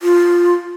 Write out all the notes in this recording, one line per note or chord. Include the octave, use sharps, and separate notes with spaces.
F4